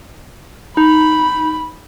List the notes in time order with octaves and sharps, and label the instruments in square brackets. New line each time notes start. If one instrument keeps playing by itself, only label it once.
[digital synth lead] D#4 [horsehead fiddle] B5